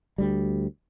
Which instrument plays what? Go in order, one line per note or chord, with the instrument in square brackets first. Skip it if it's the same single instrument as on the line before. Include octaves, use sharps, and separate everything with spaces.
[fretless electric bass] D2 G3